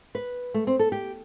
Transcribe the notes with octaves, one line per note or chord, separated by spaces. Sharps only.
B4
A3
C4
A4
G4